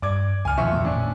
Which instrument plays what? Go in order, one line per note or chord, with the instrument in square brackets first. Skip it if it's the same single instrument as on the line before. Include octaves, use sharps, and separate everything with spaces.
[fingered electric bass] G2 [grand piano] D5 D6 G#6
[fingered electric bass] C#2 [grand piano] G#5 F6
[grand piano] F2 E5 C#6 [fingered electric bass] B2 D#3
[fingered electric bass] A#2 E3 A3
[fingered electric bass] G#1 A#2 A3 [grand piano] C#4 D4